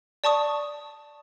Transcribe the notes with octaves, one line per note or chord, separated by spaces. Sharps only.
D5 A5 C#6 D#6